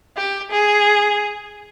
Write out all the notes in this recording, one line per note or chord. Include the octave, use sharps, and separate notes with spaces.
G4
G#4